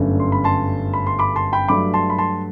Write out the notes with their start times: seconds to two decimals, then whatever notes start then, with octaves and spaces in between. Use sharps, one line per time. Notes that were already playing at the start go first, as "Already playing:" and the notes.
Already playing: G1 F#2 D3 A3
0.20 C6
0.32 B5
0.44 A5 C6
0.93 B5
1.07 C6
1.19 B5 D6
1.36 A5 C6
1.53 G5 B5
1.68 G2 F#3 A3 B5 D6
1.94 A5 C6
2.10 B5
2.18 A5 C6